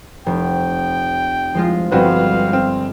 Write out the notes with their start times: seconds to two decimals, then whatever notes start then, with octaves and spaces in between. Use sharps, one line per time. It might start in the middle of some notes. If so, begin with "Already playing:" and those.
0.26 F1 G5
1.54 F3 G#3 F4
1.92 G1 F3 C4 F#4 B4 F5
2.53 C4 F6